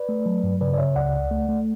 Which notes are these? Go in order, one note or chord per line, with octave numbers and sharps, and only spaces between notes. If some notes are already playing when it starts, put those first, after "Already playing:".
Already playing: B4 D5
A3
F#3
G2
C#3 B4 D5
D5
C#3 C#5 E5
C#2 D5 F#5
C#2
A3
A3